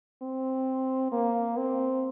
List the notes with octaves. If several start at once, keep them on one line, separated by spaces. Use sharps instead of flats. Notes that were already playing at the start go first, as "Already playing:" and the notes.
C4
A#3
C4